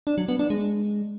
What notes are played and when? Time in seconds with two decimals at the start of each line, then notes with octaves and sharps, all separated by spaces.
0.07 D4
0.18 F#3
0.28 B3
0.39 D4
0.50 G#3